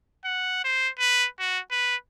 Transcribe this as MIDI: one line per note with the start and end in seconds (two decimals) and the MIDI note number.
0.24 0.62 78
0.64 0.89 72
0.99 1.27 71
1.39 1.59 66
1.71 1.96 71